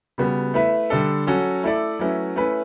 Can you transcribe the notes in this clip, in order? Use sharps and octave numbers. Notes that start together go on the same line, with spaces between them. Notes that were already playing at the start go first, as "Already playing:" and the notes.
C#3 G3 B3 F#4
A3 E4 B4 E5
D3 G3 D4 A4
F#3 C#4 F#4 A4
A3 E4 A4 D5
F#3 A3 C#4 E4 B4
A3 C#4 E4 B4